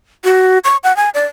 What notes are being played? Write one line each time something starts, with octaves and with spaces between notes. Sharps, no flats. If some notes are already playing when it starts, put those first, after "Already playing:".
F#4
C#6
F#5
G#5
D5